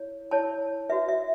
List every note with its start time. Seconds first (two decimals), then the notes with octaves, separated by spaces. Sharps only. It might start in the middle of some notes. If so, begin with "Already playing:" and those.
Already playing: E4 C#5
0.31 E4 C#5 A5
0.90 F#4 B4 E5
1.08 E5